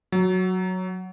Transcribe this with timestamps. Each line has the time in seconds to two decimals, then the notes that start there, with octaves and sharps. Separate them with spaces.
0.12 F#3